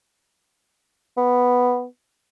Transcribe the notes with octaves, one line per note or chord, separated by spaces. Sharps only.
B3